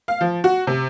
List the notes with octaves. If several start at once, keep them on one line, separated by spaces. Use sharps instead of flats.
F5
F3
F#4
C3